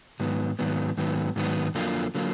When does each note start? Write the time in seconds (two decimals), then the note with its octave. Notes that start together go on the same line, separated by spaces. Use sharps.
0.20 G#2 D#3 F#3 B3
0.59 G#2 D#3 F#3 B3
0.97 G#2 D#3 F#3 B3
1.36 G#2 D#3 F#3 B3
1.75 F2 D3 F#3 A#3 F4
2.15 D3 F#3 A#3 F4